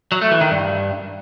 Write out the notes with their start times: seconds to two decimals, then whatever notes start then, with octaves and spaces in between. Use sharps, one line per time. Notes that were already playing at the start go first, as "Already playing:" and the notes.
0.12 F#3
0.21 A3
0.31 E3
0.41 D#3
0.51 G2